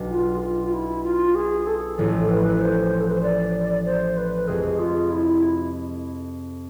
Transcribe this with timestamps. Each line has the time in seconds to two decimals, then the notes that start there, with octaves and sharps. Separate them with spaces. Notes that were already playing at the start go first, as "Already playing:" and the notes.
Already playing: B1 B2 B3 D4
0.11 F4
0.37 G#4
0.41 F4
0.65 F4
0.73 E4
1.04 F4
1.35 G#4
1.67 A4
1.98 A1 A2 F3 A4
2.29 B4
2.55 B4
2.61 C5
3.01 A4
3.08 B4
3.15 C5
3.23 D5
3.86 C5
4.17 B4
4.48 F2 C3 G#3 G#4
4.79 F4
5.11 E4